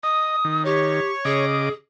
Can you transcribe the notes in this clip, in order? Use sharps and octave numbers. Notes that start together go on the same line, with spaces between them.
D#5 D#6
D#3
G4 C#5
C#3 G#4 D#5 D6